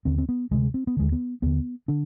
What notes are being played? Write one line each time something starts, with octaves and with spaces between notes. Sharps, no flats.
D#2 D3 C4
C4
B3
D2 C3 G#3
C4
B3
D#2 D3 G#3
B3
D#2 D3 B3
D3 D4